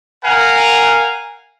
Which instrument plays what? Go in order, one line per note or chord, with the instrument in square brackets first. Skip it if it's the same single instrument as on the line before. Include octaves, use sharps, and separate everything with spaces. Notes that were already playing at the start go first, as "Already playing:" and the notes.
[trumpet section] A#4 F5 F#5 G#5